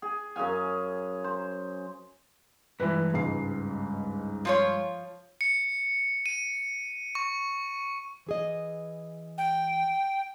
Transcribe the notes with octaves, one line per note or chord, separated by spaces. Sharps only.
G#4
F#2 G#4 F5 G#5
C5
G2 E3 G#3 B4
C#2 G#2 C7
F3 F4 C#5
C#7
D#7
C#6
E3 G#4 D#5
G5